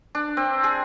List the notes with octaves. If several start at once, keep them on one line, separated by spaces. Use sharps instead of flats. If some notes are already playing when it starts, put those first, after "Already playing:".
D4
C4
G#4